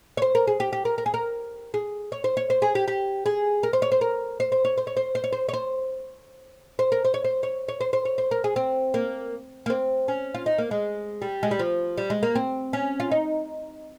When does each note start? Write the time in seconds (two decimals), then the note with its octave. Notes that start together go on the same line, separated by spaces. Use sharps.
0.17 C#5
0.22 C5
0.35 A#4
0.47 G#4
0.60 G4
0.73 G4
0.85 A#4
0.98 A#4
1.06 G#4
1.14 A#4
1.74 G#4
2.12 C#5
2.24 C5
2.37 C#5
2.50 C5
2.62 G#4
2.75 G4
2.88 G4
3.26 G#4
3.63 A#4
3.73 C5
3.82 C#5
3.92 C5
4.01 A#4
4.40 C5
4.52 C5
4.65 C#5
4.78 C5
4.87 C#5
4.97 C5
5.15 C5
5.24 C#5
5.33 C5
5.49 C#5
5.53 C5
6.79 C5
6.92 A#4
7.05 C5
7.14 C#5
7.24 C5
7.43 C#5
7.68 C#5
7.80 C5
7.93 C5
8.05 C#5
8.18 C5
8.31 A#4
8.44 G#4
8.56 C4
8.94 A#3
9.66 A#3
9.70 C4
10.08 C#4
10.34 F4
10.46 D#4
10.58 A#3
10.71 G#3
11.22 G3
11.43 G#3
11.51 G3
11.59 F3
11.98 G3
12.10 G#3
12.23 A#3
12.35 C4
12.73 C#4
13.00 F4
13.11 D#4